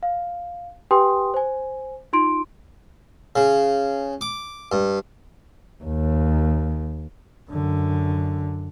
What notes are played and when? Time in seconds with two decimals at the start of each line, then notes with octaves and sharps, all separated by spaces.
0.03 F5
0.91 G4 B4 G5 G#5 C6 D#6
1.34 C5 G#5
2.13 D#4 F4 C6 D7
3.36 C#3
4.21 D6
4.72 G2
5.84 D#2
7.50 F#2 D3